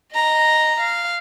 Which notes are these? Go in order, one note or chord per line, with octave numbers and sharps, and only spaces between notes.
D#5 A#5
F5